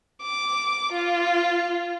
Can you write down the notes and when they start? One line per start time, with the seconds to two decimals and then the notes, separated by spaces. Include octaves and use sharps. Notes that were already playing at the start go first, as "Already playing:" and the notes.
0.22 D6
0.92 F4